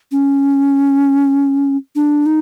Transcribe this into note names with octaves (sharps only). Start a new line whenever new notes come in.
C#4
D4
D#4